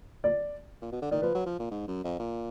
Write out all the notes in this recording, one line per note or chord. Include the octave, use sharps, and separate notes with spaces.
D5
A#2
B2
D3
D#3 D5
F3 B4
F#3
F3
A#2
G#2
F#2
F2
A#2